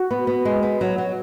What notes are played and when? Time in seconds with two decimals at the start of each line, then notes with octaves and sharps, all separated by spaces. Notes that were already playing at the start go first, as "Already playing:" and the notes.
Already playing: F#4
0.11 B3
0.27 B3
0.45 G#3
0.63 B3
0.81 F#3
0.98 F#3